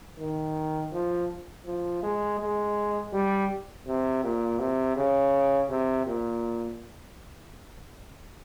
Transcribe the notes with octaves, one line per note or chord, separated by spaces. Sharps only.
D#3
F3
F3
G#3
G#3
G3
C3
A#2
C3
C#3
C3
A#2